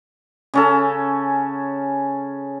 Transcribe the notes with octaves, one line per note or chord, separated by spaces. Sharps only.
C#3 C#4 A4